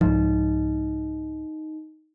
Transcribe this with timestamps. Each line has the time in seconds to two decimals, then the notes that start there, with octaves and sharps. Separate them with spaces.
0.01 C2 G#2 F3 D#4